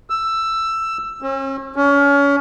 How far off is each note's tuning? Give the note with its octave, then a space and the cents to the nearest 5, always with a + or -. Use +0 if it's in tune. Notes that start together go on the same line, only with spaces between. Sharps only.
E6 +10
C#4 -40
C#4 +30